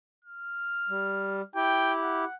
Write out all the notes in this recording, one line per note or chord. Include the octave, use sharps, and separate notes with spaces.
F6
G3
E4 G4 G5
F#5